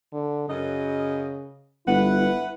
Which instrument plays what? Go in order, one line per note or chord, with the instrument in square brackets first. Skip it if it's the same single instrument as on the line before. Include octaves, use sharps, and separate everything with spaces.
[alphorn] D3
[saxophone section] F#2 D#5 [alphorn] C#3
[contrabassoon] G1 [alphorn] E4 [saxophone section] B4 F#5